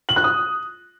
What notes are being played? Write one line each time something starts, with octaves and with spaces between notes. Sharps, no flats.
F#7
F#6
D#6